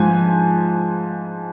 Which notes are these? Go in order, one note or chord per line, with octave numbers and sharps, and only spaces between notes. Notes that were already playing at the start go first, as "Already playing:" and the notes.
Already playing: G#2 F3 G#5